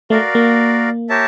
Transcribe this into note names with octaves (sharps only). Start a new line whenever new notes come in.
A3 F#4 A#4 D5 F5
A#3
G4 A#4 C#5 E5 A5